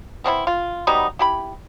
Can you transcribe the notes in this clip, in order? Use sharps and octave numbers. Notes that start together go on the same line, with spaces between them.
B3 C4 D4 E4
F4
F#3 G3 B3 D#4
E4 G4 B5